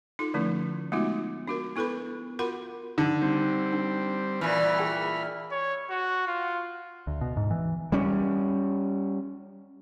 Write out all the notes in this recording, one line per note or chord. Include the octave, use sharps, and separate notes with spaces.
D#4 F4 A4 C6
D3 F3 A3 C#4 E4
G#3 A3 B3 D#4 F4 F#4
D4 F#4 A#4
B3 E4 A4 B4 B5
F4 F#4 A#4 F#5 B5 C6
D3 D#4
G3 C4
D4
A#2 E3 B5 F6
G#4 G5 A5
C#5
F#4
F4
D2
B2
G#2
E3
G3 C#4